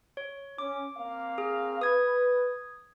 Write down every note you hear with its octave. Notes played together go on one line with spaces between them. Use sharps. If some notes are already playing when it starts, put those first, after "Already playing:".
C#5
C#4 D6
A#3 C4 F5
G#4
B4 D#6 G#6